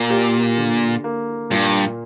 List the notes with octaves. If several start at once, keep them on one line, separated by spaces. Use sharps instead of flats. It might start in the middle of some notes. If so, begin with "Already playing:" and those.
Already playing: A#2 A#3
G4
D3
A#3
G2 A#2